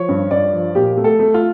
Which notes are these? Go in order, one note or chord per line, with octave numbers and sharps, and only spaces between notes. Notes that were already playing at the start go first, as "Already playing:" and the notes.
Already playing: F3 C#5
G2
G2 D5
F3
A#2 G4
A3
A4
A3
F4